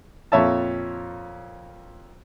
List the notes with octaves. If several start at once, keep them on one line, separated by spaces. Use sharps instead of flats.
F2 A#2 C#5 E5 A5